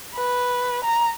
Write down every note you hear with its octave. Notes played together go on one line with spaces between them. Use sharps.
B4
A#5